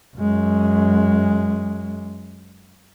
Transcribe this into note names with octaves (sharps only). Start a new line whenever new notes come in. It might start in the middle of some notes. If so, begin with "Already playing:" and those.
F#2 G#3